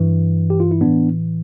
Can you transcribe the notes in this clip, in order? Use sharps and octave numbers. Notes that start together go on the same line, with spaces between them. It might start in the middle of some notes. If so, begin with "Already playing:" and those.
Already playing: G2 E3
G4
F4
E4
A2 E3 B3 D4